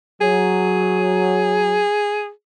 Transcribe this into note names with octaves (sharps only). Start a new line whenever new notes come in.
F#3 G#4